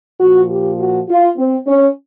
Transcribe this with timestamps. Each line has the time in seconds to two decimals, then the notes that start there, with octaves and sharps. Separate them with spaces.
0.19 A#2 F3 F#4
0.50 G4
0.79 F#4
1.09 F4
1.37 C4
1.67 C#4